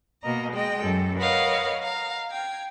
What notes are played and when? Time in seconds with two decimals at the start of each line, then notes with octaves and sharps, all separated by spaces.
0.23 B2 A#3 D#5 A#5
0.53 G#3 D#5 G5
0.82 F#2 A4
1.18 A#4 B4 C#5 D#5 F5 F#5
1.83 F5 A#5
2.31 G5 G#6